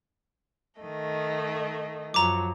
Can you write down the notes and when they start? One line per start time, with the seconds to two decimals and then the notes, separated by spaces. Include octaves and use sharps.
0.80 D#3 A3 D#5
2.14 F#2 F3 F#3 A#5 D6